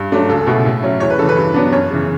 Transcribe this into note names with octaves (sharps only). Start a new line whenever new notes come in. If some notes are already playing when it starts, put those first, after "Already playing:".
Already playing: G2
F#3 A3 D4
C#2 A4
B2 A3 E4
A2
F#3 C#4 E4
E2 C#5
B4
C#3 E3 A4
B4
G2
F#3 B3 D4
F#2 C#5
C#3 E3